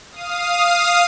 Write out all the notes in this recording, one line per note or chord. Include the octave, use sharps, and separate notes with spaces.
F5 D#6